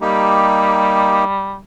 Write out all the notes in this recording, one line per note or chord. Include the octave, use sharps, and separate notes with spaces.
G3 A#3 D#4 G4